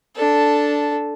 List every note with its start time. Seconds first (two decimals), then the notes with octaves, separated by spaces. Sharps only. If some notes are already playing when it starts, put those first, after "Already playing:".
0.16 D4 A4